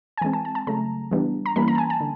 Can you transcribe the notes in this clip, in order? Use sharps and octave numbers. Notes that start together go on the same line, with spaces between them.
G#5
E3 G#3 C4 A5
A5
A5
A5
C#3 F#3 A3 A#5
E3 G3 B3 D4
A#5
E3 G3 A#3 C#4 B5
A#5
A5
G#5
A5
D3